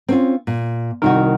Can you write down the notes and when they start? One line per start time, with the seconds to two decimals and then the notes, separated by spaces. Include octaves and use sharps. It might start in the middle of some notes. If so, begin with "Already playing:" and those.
0.08 C4 C#4 F4
0.47 A#2
1.02 C2 D#3 D#4 F4 F#4 A#4